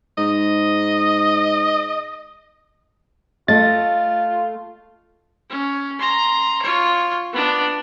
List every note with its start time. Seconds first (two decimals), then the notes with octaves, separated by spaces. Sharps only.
0.18 G#2 D#5
3.48 A3 F4 D#5 A6
5.50 C#4
5.99 A#5 C6
6.62 F4 C#5
7.33 B3 D4